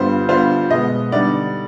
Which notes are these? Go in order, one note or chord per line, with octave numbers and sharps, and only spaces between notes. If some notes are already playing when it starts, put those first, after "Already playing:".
Already playing: G2 D3 G3 B3 F4 C5
D3 G3 B3 D4 F4 C5
B2 G#3 B3 D#5
D3 G3 B3 D#4 D5